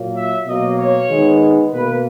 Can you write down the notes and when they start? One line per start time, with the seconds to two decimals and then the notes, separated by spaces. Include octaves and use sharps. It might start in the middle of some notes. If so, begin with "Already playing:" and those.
Already playing: A#2 F#3 A#3
0.16 E5
0.46 B2 F#3 A#3 D#5
0.77 C#5
1.08 D#3 G#3 B3
1.70 B2 A#3 B4